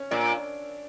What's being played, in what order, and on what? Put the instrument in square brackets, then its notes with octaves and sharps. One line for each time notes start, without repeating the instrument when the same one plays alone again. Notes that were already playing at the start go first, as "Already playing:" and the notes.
Already playing: [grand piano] C#4
[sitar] A#2 [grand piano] D4